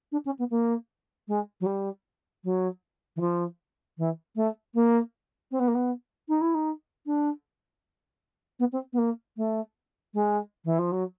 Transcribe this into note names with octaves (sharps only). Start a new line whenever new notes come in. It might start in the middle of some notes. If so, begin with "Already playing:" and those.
D4
C#4
B3
A#3
G#3
F#3
G3
F#3
E3
F3
E3
A3
A#3
C4
B3
A#3
B3
D#4
E4
D#4
D4
B3
C4
B3
A#3
A3
G#3
E3
F3
F#3